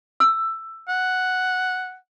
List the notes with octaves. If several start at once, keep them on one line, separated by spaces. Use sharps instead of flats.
E6
F#5